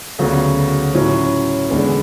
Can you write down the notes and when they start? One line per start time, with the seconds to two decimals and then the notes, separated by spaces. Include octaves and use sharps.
0.19 D2 C#3 F#3 B3
0.94 A2 F#3 C#4 E4
1.69 E2 D3 G#3 B3